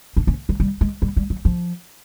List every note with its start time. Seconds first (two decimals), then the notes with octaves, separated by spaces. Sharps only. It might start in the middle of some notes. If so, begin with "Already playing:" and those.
0.16 D4
0.27 C#4
0.49 F#3
0.60 G3
0.81 G#3
1.02 G3
1.17 G3
1.30 F#3
1.45 F3